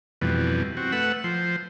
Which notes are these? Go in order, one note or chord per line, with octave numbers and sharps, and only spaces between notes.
F2 B2 E3 G3
C4 F#4
A3 B4 F#5 E6
F3 C5